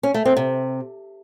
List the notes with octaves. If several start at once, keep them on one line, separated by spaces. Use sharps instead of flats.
C#4
A3
C4
C3